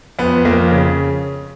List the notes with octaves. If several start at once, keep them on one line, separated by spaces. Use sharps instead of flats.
F2 B3
F2 A#3
C#3